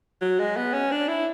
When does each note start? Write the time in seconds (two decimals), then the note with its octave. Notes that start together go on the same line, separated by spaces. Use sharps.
0.21 F#3
0.39 G#3
0.56 B3
0.73 C#4
0.91 D4
1.08 E4